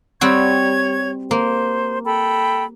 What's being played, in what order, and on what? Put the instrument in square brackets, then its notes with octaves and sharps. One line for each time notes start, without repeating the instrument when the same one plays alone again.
[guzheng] G3 C4 F#4 [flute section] C#5 C#6 G#6
[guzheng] A#3 [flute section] C5
[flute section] A4 G5 B5